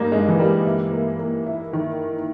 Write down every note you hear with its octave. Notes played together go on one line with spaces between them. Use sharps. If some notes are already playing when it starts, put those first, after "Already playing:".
Already playing: G2 G3 A#3 D#4
G2 G#3
E3
G3 A#3
E4
A#3
A#3
E4
D#3